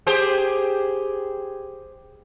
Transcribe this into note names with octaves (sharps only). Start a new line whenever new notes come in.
G4 G#4 C5